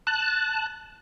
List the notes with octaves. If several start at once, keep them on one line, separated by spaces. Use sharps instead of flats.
A5 F#6